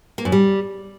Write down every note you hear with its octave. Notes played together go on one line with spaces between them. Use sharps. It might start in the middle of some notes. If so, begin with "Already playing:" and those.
A#3
F#2
G3